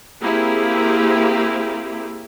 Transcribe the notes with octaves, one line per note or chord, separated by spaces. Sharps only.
A#3 C4 E4 G4 G#4